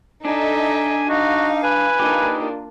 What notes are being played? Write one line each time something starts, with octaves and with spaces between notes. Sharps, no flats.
D4 D#4 A4 E5 G#5
D#4 F#4 F5
B4 G#5
A#3 D4 D#4 F4 G4